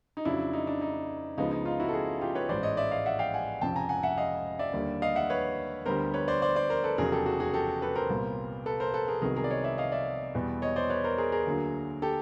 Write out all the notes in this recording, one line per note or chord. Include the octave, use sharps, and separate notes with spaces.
D#4
F2 C#3 F#3 D4 E4
D#4
D4
D#4
C#2 C#3 F3 G#3 B3 D#4
D#4
D#4 F4
E4 F#4
A4
F#4 G#4
F4 G4
B4 C#5
A1 G#2 E3 C5 D5
C#5 D#5
D5 E5
D#5 F5
E5 F#5
F5 G5
F#5 G#5
F1 F2 C#3 G5 A5
G#5 A#5
F#5 G#5
E5 F#5
D#5 F5
D5 E5
D#2 D3 G3 A#3
D#5 F5
E5 F#5
B4 C#5
D2 D3 G3 B3 A#4 C5
B4 C#5
C5 D5
C5 D5
C5 D5
A#4 C5
A4 B4
F1 E2 C#3 F#3 G#4 A#4
G4 A4
F#4 G#4
F#4 G#4
G4 A4
A4 B4
A#4 C5
C2 A#2 G3 B3
A4 B4
A#4 C5
A4 B4
G#4 A#4
C2 C3 D#3 F#3 B3 G#4 A#4
G#4 A#4
D5
C#5 D#5
D5 E5
D#5 F5
D5 E5
E2 B2 G3 B3
C#5 D#5
C5 D5
B4 C#5
A#4 C5
G#4 A#4
G#4 A#4
D2 D3 F#3 A#3
G4 A4